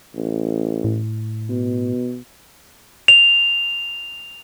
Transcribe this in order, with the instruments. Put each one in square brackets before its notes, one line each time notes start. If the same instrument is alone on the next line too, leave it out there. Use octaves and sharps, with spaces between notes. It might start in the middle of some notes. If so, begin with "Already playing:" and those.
[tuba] A1
[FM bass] A2
[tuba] B2
[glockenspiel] F7